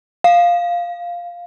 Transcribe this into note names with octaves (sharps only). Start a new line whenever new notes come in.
F5